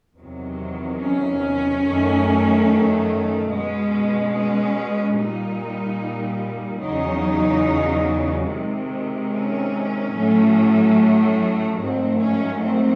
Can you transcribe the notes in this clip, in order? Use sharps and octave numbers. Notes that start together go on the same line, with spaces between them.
E2 C3 D#3 F#3
C#4
F#2 D#3 F#3 A3
B2 G#3 C#4
C#4
A#2 G3 D#4
E2 C#3 F#3 D#4
C3 D#3 G#3
C#4
A2 F#3 A3
G#2 D#3 F#3 A3 C4
C#4
C4